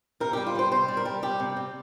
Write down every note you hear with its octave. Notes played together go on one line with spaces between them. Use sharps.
C3 A#4
G4
G3
F4
G3 C5
C3 C5
G3
A#4
G3
G3 G4
C3
C3